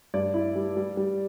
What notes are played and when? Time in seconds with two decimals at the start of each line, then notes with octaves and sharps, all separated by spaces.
0.14 G2 D5
0.34 E4
0.55 G3
0.77 G3
0.97 G3